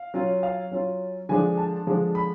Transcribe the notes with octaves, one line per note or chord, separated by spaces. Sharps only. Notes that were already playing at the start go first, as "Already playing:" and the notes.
Already playing: F5
F#3 C#4 F4
F5
F#3 C#4 F4
D3 F3 G#3 D4 G#5
A5
D3 F3 G#3 D4
B5